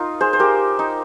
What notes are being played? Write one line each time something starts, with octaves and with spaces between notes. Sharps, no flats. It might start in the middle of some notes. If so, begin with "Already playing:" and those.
Already playing: D#4 F4 A#4
G#4 C5
C5
G4 A#4
D#4